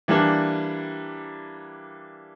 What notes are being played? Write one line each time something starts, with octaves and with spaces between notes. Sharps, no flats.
E3 G3 A#3 D4